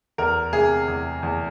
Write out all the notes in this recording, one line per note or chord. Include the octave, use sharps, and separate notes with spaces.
E2 A#4
C3 G#4
E2
E2